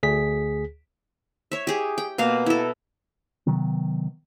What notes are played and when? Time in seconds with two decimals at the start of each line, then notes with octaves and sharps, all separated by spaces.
0.03 D2 G#4 B6
1.52 C#5 E5
1.67 G4 G#4
1.98 G5
2.18 B2 A#3 F5
2.46 E4 A4
3.47 C3 D#3 F#3 B3